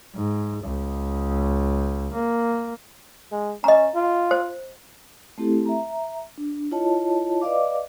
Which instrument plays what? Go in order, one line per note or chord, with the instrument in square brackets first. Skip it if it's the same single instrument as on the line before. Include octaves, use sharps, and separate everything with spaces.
[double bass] G#2
C#2
A#3
[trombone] G#3
[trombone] C#4 [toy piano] D#5 A#5
[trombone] F4
[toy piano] C5
[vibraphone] A3 C4 E4 G4 A4
E5 A#5
D4
E4 F4 C#5 D#5 A5
B4 D5 D#5 F5 D6